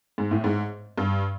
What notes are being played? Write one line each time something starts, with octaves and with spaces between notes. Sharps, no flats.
G#2
A2
G#2
G2